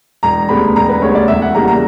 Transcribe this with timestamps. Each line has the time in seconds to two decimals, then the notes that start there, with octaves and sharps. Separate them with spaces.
0.23 E1 A#5
0.49 D2 C#3 G3 B3 B5
0.76 E1 A#5
0.89 B4
1.02 D2 C#3 G3 B3 C#5
1.15 D5
1.28 E1 E5
1.42 F#5
1.55 E2 C#3 G3 A#3 A#5
1.68 A#5